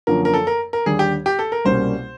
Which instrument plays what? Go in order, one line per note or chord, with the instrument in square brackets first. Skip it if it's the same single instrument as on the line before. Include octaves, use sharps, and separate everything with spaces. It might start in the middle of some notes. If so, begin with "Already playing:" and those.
[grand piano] F#2 D3 F3 A#3 [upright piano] A#4
[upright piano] A#4
A4
A#4
A#4
[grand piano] D#2 D3 G3 [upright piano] G#4
[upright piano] G4
G4
A4
A#4
[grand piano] C2 B2 G3 A#3 C#4 [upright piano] C5